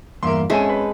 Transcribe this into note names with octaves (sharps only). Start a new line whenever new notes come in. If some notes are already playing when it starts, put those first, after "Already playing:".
E2 G2 A#3 A#4 E5 C6
G#1 G#3 C#4 A4 E5 G#5
B4